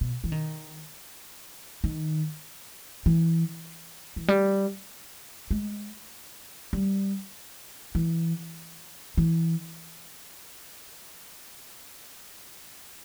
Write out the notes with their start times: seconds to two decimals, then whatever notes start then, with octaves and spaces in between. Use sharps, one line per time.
0.01 B2
0.24 E3
0.32 D#3
1.84 D#3
3.06 E3
4.16 E3
4.28 G3
5.51 G#3
6.73 G3
7.95 E3
9.17 E3